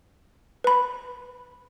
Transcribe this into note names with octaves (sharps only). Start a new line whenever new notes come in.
B4 B5